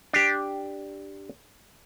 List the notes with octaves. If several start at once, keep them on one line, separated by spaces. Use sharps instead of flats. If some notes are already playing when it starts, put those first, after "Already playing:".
D4 G4